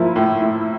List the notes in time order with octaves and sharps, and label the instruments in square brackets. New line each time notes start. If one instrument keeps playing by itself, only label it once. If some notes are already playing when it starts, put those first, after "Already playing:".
Already playing: [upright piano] F3 A#3 [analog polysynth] E4
[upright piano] A2
A2